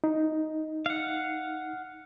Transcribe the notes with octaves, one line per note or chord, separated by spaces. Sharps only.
D#4
F5 F#5